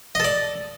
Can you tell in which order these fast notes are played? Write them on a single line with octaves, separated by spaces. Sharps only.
D#5 A4 D5